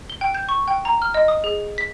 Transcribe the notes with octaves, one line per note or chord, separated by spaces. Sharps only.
G7
G5
G6
C#6
G5
A#5
F6
D#5
D#6
G#4
B6